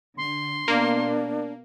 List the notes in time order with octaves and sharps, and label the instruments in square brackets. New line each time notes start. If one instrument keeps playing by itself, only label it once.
[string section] D3 [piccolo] C6
[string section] B2 [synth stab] A#3 [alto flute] D4